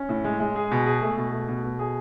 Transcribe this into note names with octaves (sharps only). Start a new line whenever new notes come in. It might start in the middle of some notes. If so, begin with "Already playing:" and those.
Already playing: C#4
A2
G#3
G#3
G#4
B2
G#4
A3
B2
A3
B2
B2
G#4